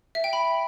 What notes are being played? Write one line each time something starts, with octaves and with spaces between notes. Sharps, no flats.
E5
G5
B5